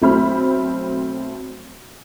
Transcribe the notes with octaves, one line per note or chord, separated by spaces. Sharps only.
B1 A3 C4 C5 B5 F6